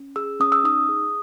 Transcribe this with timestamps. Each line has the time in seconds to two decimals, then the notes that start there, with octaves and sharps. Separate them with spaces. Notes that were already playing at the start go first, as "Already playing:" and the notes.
Already playing: C#4
0.16 G#4 E6
0.40 C#4 D#6
0.52 E6
0.64 D#4 D#6
0.89 G#4